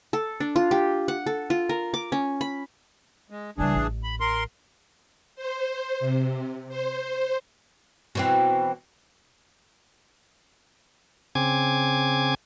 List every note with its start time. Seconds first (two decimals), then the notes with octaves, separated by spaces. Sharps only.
0.13 A4
0.40 D4
0.56 F4
0.71 G4
1.08 F#5
1.26 A4
1.50 F4
1.69 A#4
1.94 D6
2.12 C#4
2.41 B5
3.30 G#3
3.58 C#2 E3 G3 D4 G#4
3.75 A1
4.04 B5
4.20 A#4 C6
5.36 C5
6.00 C3
6.69 C5
8.15 B2 E3 C4
11.35 C#3 C4 G#5 D6 G#6